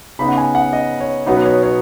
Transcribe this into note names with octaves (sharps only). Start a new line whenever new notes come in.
C#3 B3 D#4 B5
F#5
G#5
F#5
D#5
C#5
B2 F#3 B3 D#4 F#5
B4
C#5
C#5